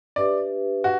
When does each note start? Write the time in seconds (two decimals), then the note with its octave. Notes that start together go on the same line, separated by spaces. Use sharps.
0.16 D4 G4 B4 D5 E5
0.84 F#4